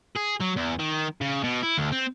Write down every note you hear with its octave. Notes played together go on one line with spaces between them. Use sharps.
G#4
F#3
E2
D#3
C#3
B2
E4
D2
C4